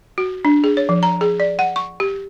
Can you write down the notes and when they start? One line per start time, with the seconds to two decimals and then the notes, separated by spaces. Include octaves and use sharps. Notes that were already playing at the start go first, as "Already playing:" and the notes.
0.18 F#4
0.45 D4
0.64 G#4
0.77 C#5
0.89 F3
1.03 A#5
1.21 G#4
1.40 D5
1.59 F#5
1.76 C#6
2.00 G4